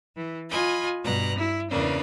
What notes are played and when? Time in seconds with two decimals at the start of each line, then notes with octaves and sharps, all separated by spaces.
0.15 E3
0.48 F4 D#5 G#5 B5
1.03 G2 B2 A#5 F#6
1.36 E4
1.69 E2 C#3 A#3 D4 B4